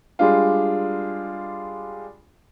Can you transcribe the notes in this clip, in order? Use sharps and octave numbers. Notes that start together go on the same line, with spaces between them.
G3 G#3 D4 F4